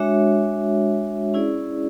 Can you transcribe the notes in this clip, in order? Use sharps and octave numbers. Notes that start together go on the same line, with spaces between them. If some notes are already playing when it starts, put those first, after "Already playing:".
Already playing: G#3 D4 F#4 C#5 E5
C#4 E4 G#4 D5